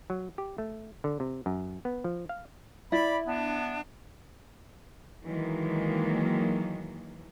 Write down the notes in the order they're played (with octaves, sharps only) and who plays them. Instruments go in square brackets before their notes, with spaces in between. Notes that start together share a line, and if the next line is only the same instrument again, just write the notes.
[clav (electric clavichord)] F#3
G4
A3
D3
C3
F#2
B3
F3
F5
[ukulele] E4 [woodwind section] D5 B5
[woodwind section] B3 D4
[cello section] D#3 E3 F#3 G#3 A#3